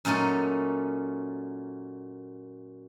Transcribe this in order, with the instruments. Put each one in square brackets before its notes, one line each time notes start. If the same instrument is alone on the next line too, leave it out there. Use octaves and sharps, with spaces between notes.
[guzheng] F#2 A#2 A3 C#4 D#4